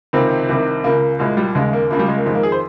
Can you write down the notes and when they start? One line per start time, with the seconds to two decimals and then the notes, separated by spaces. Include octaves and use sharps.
0.13 C#2 C3 D#3 C4
0.49 C2 C3 D#3
0.84 C#2 C#3 A#3
1.19 C2 A#2 G#3
1.37 G3
1.55 D#2 C#3 G#3
1.73 A#3
1.90 C#2 C#3 A#3
1.99 G3
2.08 G#3
2.17 A#3
2.25 F2 D#3 G#3
2.35 A#3
2.43 G#4
2.52 C5